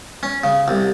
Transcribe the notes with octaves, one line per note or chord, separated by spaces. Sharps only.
C#4
C#3
C2